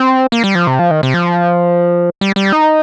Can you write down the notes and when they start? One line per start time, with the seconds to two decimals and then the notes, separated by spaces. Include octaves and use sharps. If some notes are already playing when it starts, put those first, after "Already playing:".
Already playing: C4
0.32 A#3
0.44 G3
0.55 F3
0.67 C3
0.79 F3
0.91 D#3
1.03 C3
1.14 F3
2.21 G3
2.36 G3
2.52 D#4